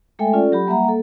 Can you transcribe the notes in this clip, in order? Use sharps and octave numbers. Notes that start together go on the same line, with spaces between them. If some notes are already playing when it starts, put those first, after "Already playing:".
G#3 A3 A4 E5 G5 G#5
C#4 F4 A4 D5
F#3 G4 B5
G3 A#3 E5 F#5 A#5
A#3 A4